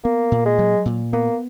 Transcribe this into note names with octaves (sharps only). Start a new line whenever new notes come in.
A#3 B3
A#2
G#3
F#3
A#2
A#3 B3